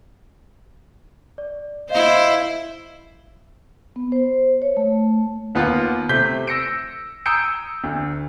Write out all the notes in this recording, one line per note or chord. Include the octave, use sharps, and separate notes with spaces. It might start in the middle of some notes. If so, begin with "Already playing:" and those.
D5
E4 C5 D#5 F5
B3
C5
C#5
A3
D#2 B3 F4 F#5
C3 A3 G6 B6 G7
E6 A#6 C#7 D7
A#5 D#6 E6 G6 C#7 D7
D2